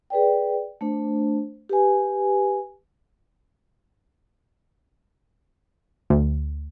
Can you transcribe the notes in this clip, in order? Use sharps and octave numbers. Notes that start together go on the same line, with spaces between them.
G#4 B4 D5 G5
A3 D4 C5
G4 B4 G#5
D2